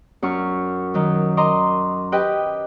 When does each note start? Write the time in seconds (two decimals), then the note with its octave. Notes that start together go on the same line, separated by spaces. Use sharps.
0.23 F#2 C#6 F6
0.94 D#3 F#3
1.37 D#5 A#5 C6 D6
2.12 G4 B4 D#5 G5